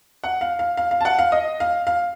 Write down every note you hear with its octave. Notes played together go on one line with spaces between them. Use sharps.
F#5
F5
F5
F5
F5
A5
F#5
F5
D#5
F5
F5